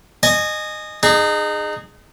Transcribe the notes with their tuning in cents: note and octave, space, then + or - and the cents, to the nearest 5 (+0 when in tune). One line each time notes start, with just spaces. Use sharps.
D#5 -20 G#5 +10
D#4 -30 G#4 +0